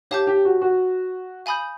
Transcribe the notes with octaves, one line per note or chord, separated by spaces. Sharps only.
G4 C#5 F5 A5 D6 G6
G4
F#4
F#4
F5 G#5 B5 D#6 G6